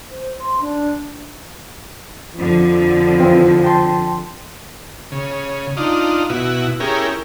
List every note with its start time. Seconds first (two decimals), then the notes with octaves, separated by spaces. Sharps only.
0.11 C5
0.39 C6
0.61 D4
2.35 F2 D3 F3
3.19 E3 C4 F4
3.64 G5 A5 C6
5.12 C#3
5.77 D4 D#4 F4
6.29 B2 E4 F#4
6.80 C#4 E4 G4 G#4 A#4